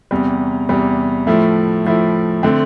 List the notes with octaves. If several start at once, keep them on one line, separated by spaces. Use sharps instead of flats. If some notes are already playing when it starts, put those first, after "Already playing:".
E2 C3 G3
E2 C3 G3
A2 F3 A3 E4
A2 F3 A3 E4
D3 A3 C4